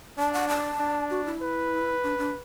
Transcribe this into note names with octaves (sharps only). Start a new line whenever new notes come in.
D4 A5
F#5
A5
D4
F#4
E4
B4
D4
D4